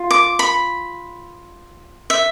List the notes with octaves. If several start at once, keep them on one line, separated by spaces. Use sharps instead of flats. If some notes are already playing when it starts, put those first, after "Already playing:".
Already playing: F4
D6
B5
E5